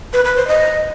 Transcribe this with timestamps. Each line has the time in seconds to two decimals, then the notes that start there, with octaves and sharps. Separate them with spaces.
0.13 B4
0.25 B4
0.36 C5
0.48 D#5